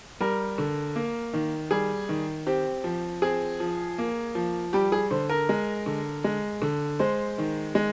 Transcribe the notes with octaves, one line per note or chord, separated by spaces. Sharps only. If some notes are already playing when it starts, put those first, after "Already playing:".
G3 A#4
D3
A#3
D#3
G3 G#4
D#3
C4 G4
F3
C4 G#4
F3
A#3
F3
G3 G4
G#4
D3 C5
A#4
G#3
D3
G#3
D3
G#3 C5
D#3
G#3